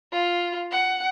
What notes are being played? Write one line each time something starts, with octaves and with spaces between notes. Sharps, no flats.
F4
F#5